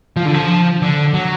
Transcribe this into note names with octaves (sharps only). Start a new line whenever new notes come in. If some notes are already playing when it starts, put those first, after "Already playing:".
F3
D3
F3
D3
F#3